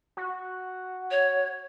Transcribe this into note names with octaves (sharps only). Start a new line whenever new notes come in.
F#4
C#5